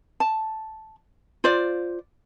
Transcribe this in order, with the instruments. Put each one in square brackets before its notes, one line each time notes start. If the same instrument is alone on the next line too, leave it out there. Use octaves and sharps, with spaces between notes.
[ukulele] A5
F4 C5 D5